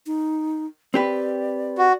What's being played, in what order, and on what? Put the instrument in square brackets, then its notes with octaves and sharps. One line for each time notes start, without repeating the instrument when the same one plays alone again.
[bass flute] D#4
[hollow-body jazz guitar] C4 G4 B4 [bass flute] D5
[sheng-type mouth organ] F#4